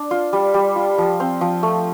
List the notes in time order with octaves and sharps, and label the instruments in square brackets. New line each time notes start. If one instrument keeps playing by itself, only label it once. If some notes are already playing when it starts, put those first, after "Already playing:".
Already playing: [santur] D4
F4
G3
G3
F4
F3
C4
F3
A3